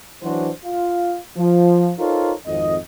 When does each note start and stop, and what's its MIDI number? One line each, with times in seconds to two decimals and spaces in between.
0.23 0.50 52
0.23 0.50 54
0.23 0.50 62
0.23 0.50 66
0.23 0.50 72
0.64 1.17 65
0.64 1.17 77
1.37 1.92 53
1.98 2.32 63
1.98 2.32 65
1.98 2.32 69
1.98 2.32 70
1.98 2.32 72
1.98 2.32 73
2.46 2.77 32
2.46 2.77 41
2.46 2.77 75